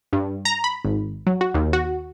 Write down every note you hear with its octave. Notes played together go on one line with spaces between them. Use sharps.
G2
A#5
B5
G#1
F#3
F#4
D#2
F#4